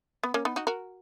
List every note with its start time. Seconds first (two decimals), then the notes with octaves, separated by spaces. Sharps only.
0.23 B3
0.34 A#3 C#4
0.45 B3 D#4
0.56 D#4 F#4
0.67 F#4 A#4